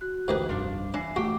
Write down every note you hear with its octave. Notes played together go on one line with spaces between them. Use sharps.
F#4 F#6
A1 D2 G#2 D#3 G4 G#4 B4
F1 C2 G2 F3 D4
E3 D4 G#5 C7
A1 A3 F#4 G4